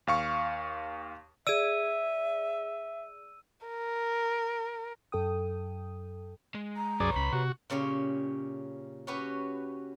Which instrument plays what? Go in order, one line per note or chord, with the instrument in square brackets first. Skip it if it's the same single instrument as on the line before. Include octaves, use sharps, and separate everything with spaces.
[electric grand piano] D#2 F5 C#6
[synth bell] G#4 D5 [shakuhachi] E5 [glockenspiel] E6 D#7
[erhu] A#4
[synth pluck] F#2 A4 G5 D#6
[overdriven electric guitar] G#3
[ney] A#5
[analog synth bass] C2 [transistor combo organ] F#2 G#4 D5 [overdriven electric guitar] B4 C#5
[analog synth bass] C#2 [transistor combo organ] B5
[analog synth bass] C3 [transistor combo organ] F#4
[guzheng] A#2 C#3 C#4 G4
C#4 F#4 G4 B4